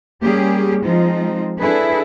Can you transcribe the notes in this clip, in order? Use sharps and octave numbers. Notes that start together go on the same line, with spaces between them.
G3 A#3 C#4 G4 G#4
F3 G#3 C4 D#4 F4
D4 E4 G#4 A4 B4